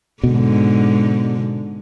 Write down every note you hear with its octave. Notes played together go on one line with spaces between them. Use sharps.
G#2 B2 D3